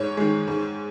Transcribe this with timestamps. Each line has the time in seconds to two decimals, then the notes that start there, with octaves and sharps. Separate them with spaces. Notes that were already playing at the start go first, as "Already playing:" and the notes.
Already playing: G#2 C#5
0.17 D#3 G#3
0.48 G#2